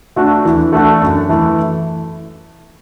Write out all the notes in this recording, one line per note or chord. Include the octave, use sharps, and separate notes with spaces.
A3 D4 F#4 A4
E3
A3 D4 F#4 A4
F#2
E3 A3 E4